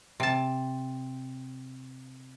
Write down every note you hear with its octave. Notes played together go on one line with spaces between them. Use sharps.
C3 A5